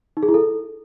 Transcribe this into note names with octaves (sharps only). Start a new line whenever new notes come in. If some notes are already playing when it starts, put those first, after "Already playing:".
D#4
G#4
E4
A4